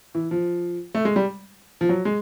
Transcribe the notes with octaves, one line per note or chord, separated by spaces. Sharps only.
E3
F3
A3
G#3
G3
F3
F#3
G#3